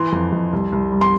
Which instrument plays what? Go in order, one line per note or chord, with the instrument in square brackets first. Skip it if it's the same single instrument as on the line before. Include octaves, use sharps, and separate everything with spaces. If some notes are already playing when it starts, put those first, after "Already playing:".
Already playing: [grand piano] E3 [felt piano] C6
[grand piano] F2
F2
C2
C2
G3
[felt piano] C6